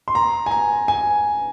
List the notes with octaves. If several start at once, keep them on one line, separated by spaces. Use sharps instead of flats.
C6
A#5
G#5
A#5
G#5